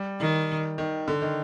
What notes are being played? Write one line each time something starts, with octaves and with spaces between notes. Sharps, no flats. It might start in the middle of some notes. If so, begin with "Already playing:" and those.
Already playing: G3
D#3
D#3
D3
D#3